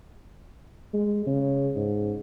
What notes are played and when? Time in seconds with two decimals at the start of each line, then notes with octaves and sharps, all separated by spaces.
0.93 G#3
1.26 C#3
1.75 G#2